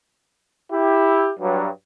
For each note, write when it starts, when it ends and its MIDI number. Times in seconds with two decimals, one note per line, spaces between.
0.72 1.31 64
0.72 1.31 67
1.40 1.68 43
1.40 1.68 54